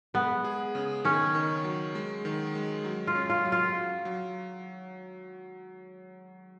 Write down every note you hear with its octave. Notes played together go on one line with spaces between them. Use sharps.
G#3 B3
G#4
C#3
D#3 C#4
D#3
F#3
G#3
D#3
G#3
F#3
F4
C#4
F4
F#3
F4
F#3
F#3